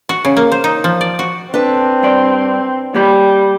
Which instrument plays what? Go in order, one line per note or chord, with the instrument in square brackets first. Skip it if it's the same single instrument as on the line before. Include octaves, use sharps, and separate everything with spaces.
[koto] F#4
C#3
A#3
C5
D#4
F3
D5
F#4
[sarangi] C4 [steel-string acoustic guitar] D4 B4
[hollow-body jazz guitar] G2 D5
[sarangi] G3 [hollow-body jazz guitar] A#3 G4 B5